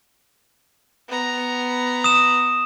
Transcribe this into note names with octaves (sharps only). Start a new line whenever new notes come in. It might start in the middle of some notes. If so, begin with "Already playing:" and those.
B3 A#5
D#6 E7